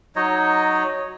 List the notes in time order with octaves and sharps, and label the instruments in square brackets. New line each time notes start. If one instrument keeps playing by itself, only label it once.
[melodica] F#3 D#4 C#5 D#5